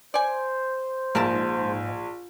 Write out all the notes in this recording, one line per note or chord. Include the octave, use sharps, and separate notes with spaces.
C5 D5 G#5
A#1 G#2 A#4 E5 A5